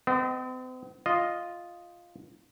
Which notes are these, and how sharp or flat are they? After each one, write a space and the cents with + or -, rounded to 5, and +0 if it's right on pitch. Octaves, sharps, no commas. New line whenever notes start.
C4 -45 D#5 +0
F4 +0 D#5 +0